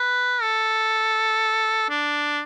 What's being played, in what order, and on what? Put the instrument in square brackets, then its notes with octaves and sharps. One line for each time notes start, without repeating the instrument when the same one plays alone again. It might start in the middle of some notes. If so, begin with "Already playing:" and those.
Already playing: [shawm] B4
A4
D4